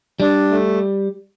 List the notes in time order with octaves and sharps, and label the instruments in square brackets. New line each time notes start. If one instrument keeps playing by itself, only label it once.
[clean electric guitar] G3 [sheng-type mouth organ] D4
[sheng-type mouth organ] A3